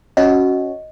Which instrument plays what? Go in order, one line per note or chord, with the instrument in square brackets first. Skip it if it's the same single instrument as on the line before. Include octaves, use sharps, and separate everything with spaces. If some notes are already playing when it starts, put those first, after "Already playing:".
[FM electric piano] C#4 F#4 [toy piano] D#5